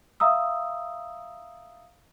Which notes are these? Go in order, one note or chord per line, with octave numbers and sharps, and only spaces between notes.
E5 F5 A#5 D#6 E6